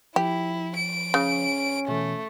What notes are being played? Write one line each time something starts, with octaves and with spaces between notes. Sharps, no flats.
F3 E4 G4
D7
C#3 C#4
B2 E3 A3